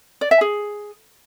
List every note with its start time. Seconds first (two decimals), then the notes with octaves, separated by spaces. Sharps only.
0.21 D5
0.31 E5
0.41 G#4